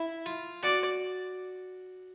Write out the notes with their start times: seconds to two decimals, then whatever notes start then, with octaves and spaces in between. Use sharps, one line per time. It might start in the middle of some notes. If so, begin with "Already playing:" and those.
Already playing: E4
0.26 F4
0.63 F#4 D5